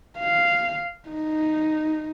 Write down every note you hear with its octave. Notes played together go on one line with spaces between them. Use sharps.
F5
D#4